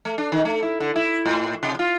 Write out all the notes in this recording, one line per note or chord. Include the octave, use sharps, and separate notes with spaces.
A3
D4
D#3
A3
E4
D3
E4
A2
C3
F4